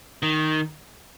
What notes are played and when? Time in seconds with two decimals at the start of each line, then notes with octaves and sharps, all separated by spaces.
0.23 D#3